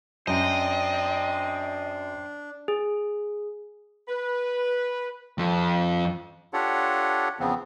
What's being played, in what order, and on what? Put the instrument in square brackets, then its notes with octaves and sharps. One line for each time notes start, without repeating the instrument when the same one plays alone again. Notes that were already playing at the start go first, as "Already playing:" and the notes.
[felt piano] F#2 [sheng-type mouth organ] D4 [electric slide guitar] C5 G5 [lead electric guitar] D#5
[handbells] G#4
[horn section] B4
[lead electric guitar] F2 F3
[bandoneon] D4 F4 G4 A4 C#5 F#5
E2 C#3 F3 B3 C4